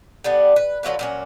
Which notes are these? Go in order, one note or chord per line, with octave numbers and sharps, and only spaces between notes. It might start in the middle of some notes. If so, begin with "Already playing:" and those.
D3 G3 B3
B4
D3 F#3 F4 B4
A#2 F#3 C#4